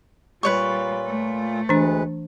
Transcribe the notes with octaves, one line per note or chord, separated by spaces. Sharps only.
A#2 G3 F4 B4 C#5 C#6
A3
D2 E3 G#3 D4 B4